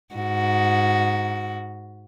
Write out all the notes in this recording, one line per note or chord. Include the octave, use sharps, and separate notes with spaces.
G#2 F#4